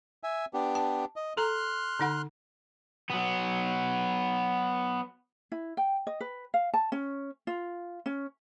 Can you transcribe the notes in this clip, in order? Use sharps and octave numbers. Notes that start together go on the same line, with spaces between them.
E5 G#5
B3 D4 G4
A5
D#5
A4 A#5 C6 F6 F#6
D3 D#4 F#5
F#3 B3
E4
G5
D#5
B4
F5
A5
C#4
F4
C#4